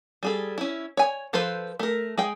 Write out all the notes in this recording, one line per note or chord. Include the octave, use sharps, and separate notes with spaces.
G3 G#4 A4
C#4 E4
C#5 G#5
F3 F4 A4 B4 C5
A3 A#4
G#3 G#4 G5